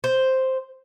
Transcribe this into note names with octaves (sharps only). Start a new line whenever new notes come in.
C5